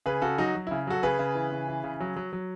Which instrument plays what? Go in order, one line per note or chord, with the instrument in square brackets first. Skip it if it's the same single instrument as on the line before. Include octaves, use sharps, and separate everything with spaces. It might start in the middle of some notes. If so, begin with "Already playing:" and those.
[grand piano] C#3 G#4 B4
C#3 F#4 A4
F#3 D#4 F#4
F#3
C#3 E4
F#3 F#4 A4
C#3 G#4 B4
C#3
E3
C#3
E3
C#3
F#3
F#3
F#3